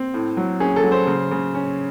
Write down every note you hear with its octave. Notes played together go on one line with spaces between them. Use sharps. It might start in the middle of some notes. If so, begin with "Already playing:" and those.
Already playing: C4
A2
F#3
C#4 G#4
A4
F#3
C5
C#3
C#3
C#4